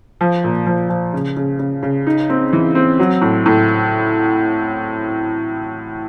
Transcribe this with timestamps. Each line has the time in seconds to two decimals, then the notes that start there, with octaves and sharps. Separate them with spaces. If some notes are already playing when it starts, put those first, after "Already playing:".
0.21 F3
0.44 A#2
0.67 F3
0.89 F3
1.13 C#3
1.37 C#3
1.59 C#3
1.83 C#3
2.07 D#4
2.30 C4
2.53 E3
2.75 C4
2.99 F#3
3.21 A2
3.46 A2